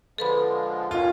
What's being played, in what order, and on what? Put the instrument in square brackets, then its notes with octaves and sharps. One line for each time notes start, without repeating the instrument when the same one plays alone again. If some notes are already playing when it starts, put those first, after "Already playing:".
[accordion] D3 F3 G#3 [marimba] A4 B4 B5
[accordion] D#3 G#3 C#4 [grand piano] F4